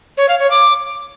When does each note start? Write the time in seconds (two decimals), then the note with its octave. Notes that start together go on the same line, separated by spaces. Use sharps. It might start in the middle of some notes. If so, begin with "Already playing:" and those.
0.18 C#5
0.29 F5
0.40 C#5
0.51 D6